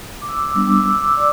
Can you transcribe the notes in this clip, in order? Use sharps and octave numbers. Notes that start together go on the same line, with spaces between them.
D6
E6
D6
E6
G3 B3 D4 D6
E6
D6
E6
D6
E6
D6
E6
D5 D6